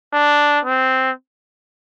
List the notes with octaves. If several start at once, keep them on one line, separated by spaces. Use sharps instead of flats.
D4
C4